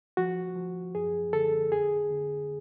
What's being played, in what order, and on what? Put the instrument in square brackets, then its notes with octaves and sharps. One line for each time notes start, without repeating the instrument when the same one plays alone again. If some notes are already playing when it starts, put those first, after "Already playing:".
[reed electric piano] F3 F#4
F3
F#2 G#4
D3 A4
F2 G#4
D3